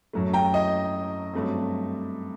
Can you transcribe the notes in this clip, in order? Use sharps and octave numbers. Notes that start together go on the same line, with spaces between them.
F#2 F#3 A3
G5 A#5
D#5
G2 F#3 A3 C4